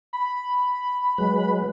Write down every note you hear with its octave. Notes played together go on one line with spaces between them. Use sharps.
B5
F#3 G#3 B4